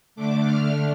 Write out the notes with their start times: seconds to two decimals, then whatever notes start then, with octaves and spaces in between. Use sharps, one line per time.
0.16 D3 A3 D4 D6
0.45 F6